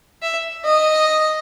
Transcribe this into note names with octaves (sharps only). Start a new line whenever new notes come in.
E5
D#5